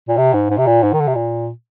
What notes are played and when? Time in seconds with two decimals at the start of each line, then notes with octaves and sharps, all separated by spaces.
0.09 A#2
0.18 C3
0.34 G#2
0.50 G#2
0.58 C3
0.67 A#2
0.83 G#2
0.93 D#3
1.00 D3
1.08 C3
1.15 A#2